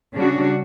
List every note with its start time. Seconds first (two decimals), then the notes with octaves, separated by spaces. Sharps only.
0.14 C#3 G3 D4 F#4